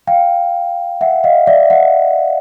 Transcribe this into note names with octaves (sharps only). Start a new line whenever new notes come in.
F5 G5
E5 F#5
D#5 F5
D5 E5
E5 F#5